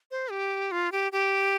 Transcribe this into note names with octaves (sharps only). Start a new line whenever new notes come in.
C5
G4
F4
G4
G4